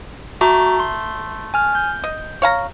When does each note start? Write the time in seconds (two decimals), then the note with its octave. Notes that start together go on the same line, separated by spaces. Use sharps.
0.41 A3 F#4 A#5 D6
0.80 C6
1.54 G#5 F6
1.75 G6
2.04 D#5
2.42 C#5 F5 A#5